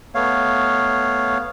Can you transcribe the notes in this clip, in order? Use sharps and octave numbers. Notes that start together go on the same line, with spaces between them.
A3 B3 C#5 F5